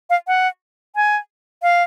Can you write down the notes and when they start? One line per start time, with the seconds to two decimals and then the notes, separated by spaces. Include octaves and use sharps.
0.10 F5
0.27 F#5
0.96 G#5
1.63 F5